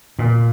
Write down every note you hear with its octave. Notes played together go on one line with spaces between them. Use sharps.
A#2